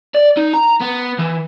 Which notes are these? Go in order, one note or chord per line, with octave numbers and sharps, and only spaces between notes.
D5
D#4
A#5
B3
E3